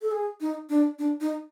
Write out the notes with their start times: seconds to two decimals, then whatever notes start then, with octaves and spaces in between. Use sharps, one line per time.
0.02 A4
0.12 G#4
0.41 D#4
0.69 D4
0.99 D4
1.20 D#4